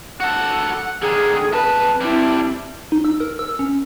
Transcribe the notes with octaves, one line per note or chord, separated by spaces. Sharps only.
F#4 A4 F#5
D3 D#3 G#4
F2 B4 A5
G3 C4 D4 E4
D#4
E6
A#4
E6
C#4